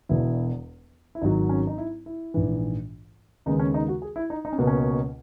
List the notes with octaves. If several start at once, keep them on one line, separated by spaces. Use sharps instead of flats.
E1 E2 B2 E4
E4
G#1 G#2 F#3 D#4
C#4
D#4
E4
E4
A#1 G#2 E3
D#2 C#3 G#3 B3 D#4
C#4
D#4
F#4
G#4
E4
D#4
D#4
C#4
C#2 B2 A#3
C#4